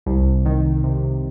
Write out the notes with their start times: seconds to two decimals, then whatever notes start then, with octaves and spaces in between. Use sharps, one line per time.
0.06 C2
0.46 D#3
0.84 C3